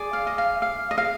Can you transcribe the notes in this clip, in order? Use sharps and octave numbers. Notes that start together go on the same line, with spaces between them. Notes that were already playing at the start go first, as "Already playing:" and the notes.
Already playing: G#4 D5
F5
D#5
F5
F5
D#5
F5